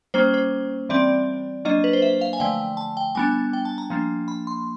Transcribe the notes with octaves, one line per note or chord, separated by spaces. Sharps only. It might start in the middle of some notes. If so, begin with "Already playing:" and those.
G3 A#3 C#4 C5
C5
E3 G3 C4 D5
F#3 A#3 D4 D#5
B4
C5
E5
F5
G#5
D3 F3 A3 G5
A5
G5
G3 B3 D4 G#5
G5
A5
A#5
F3 A#3 D4
B5
C6